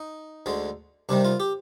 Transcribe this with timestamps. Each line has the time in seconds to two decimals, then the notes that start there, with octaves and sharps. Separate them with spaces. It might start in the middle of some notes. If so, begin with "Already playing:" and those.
Already playing: D#4
0.46 D2 D3 G#3
1.09 C2 C3 D#3 G3 D4
1.25 F4
1.40 G4